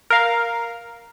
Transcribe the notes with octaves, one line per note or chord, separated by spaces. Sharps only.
A#4 F5